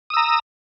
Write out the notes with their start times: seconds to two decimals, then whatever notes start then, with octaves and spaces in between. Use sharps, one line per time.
0.10 D#6
0.14 E6
0.17 A#5